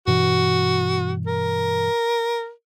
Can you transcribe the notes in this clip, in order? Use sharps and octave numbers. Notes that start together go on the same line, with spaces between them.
G2 B2 E3 F#4
A#4